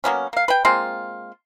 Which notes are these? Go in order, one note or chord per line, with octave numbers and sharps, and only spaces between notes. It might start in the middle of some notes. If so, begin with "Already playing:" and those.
F#3 A#3 B3 C#4
A#3 F5
B4 G5
G#3 A#3 C4 F4